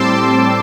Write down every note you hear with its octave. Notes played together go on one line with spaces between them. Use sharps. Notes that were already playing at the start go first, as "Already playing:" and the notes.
Already playing: A2 G3 C4 A5 C6 D6 E6